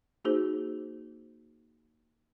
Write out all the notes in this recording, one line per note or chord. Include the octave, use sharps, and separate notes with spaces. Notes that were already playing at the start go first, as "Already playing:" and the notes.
A#3 D#4 F#4 G#4 C5